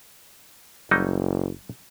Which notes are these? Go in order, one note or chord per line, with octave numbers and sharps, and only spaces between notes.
F#1 F#3 G3 D#4